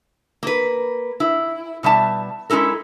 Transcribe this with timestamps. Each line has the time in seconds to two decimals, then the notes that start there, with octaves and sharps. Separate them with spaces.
0.43 A#3 B4
1.20 E4
1.83 B2 G3 E5 A5
2.50 G#3 C#4 E4 A4 A#4